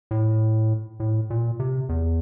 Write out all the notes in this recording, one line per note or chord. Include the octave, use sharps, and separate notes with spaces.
A2
A2
A#2
C3
E2